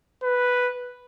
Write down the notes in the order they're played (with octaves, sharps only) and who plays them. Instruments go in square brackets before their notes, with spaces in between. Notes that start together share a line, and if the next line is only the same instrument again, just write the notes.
[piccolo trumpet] B4